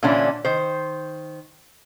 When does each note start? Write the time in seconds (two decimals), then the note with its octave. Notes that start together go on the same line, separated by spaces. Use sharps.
0.03 A#2 D3 E3 C#4 D4 E4
0.45 D#3 C5